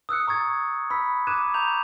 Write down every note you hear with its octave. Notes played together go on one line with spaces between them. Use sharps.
D#6 E6 F#6 C#7
A#5 C#6 D#6 G#6 A6
B5 E6 B6
D6 F#6 G#6 D#7 E7
A#5 C#6 G6 F7